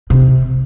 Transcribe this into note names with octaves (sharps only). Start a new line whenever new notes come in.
C3